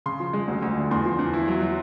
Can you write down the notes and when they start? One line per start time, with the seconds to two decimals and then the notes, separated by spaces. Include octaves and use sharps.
0.06 C#3 C6
0.20 F3
0.33 G#3
0.48 D2
0.62 D2
0.77 D3
0.91 E2 C6
1.05 F3
1.19 E2
1.33 E4
1.48 F#3
1.62 F#3